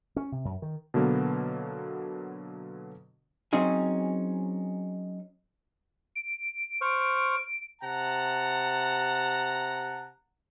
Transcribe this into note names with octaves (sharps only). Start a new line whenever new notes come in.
C#4
C3
F#2
D#3
B2 D3 F#3 A#3 B3
F#3 C4 C#4 D#4 G#4
D7
C5 C#6 F6
C3 F#5 A5 A#5